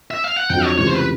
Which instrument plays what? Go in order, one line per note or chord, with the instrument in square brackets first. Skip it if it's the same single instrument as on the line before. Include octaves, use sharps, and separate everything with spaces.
[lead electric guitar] E5
F5
F#5
[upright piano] F2 D3 F#3 [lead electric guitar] G5
[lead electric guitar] C#5
[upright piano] C#2 C3 E3 A3 [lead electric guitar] C#5
[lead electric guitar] C5
B4